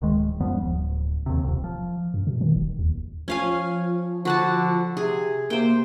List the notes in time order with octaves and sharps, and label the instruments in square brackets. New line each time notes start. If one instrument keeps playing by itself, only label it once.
[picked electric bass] D1 D#3 G#3
F#2 F3 G3 B3
D1
D#2 C3
D#1 C2
F3
[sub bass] F#2
B2
D#3
E1
D#2
[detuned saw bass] F3 [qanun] C#4 F5 G#5
[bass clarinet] D3 [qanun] F#4 F#5 A5
[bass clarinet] C3 [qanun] G#4
[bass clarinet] C3 [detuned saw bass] A#3 [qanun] C5 G5